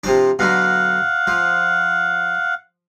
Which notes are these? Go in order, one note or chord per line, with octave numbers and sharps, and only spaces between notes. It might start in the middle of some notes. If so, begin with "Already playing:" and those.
C3 F3 D4
B2 D3 F#3 F5 F#5
F3